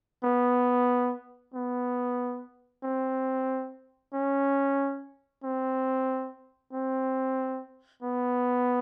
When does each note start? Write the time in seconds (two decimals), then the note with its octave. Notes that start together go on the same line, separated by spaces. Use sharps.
0.24 B3
1.54 B3
2.83 C4
4.13 C#4
5.44 C4
6.73 C4
8.03 B3